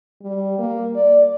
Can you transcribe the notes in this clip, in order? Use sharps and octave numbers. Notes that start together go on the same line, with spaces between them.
G3
A#3
D5